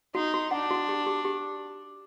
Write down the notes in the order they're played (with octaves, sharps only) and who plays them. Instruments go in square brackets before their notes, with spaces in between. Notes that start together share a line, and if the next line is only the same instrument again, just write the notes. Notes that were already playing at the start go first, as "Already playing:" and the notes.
[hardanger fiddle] D#4 [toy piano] F#4
[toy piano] F#4
[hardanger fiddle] D4 [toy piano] F#5
[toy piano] F#4
G4
G4
G4